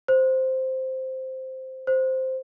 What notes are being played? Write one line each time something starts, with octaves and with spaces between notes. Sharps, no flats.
C5
C5